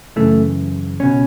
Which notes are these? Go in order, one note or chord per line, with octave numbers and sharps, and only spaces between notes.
F#2 C#3 E3 A3
C#2 B2 C#4